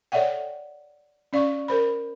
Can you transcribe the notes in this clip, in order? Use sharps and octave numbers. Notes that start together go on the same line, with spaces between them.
A4 C#5 D5 E5 F#5 G5
C#4 D5 F5 C#6
A#4 C5 B5